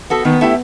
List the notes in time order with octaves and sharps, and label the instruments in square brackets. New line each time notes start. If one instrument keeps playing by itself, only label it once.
[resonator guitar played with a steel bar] B3 F#4 A4
[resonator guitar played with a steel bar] D#3 [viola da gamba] B3
[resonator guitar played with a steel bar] A3 E4 G4